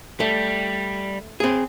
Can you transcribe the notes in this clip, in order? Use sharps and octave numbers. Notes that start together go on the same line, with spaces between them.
G3 A3
C4 G#4